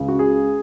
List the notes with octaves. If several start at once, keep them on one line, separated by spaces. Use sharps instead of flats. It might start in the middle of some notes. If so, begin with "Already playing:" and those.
Already playing: C#2 C#3
F#4
G#4